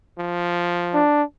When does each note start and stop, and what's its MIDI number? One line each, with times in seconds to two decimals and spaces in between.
0.18 1.01 53
0.94 1.23 62